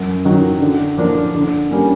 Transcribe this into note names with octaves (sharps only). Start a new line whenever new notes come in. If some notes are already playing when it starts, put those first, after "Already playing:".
Already playing: F#2
D#3 F#3
D3
F3 A#3 D4
D3
G3 A#3 C#4